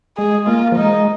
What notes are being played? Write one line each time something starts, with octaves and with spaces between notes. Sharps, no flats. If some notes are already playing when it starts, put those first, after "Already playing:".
G#3 G#4
A#3 F4
F3
G#3 D#4